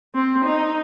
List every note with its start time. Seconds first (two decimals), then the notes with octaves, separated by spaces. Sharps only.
0.15 C4
0.45 D#4